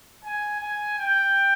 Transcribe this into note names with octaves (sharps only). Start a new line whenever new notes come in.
G#5
G#5
G5